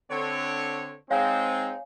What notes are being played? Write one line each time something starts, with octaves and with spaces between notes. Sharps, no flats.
D3 C4 C#5
G#3 C4 D#4 C#5 F5 G#5